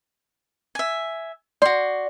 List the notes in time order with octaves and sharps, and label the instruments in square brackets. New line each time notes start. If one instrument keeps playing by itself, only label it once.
[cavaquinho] E5 G#5
[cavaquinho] F#4 C6 [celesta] D5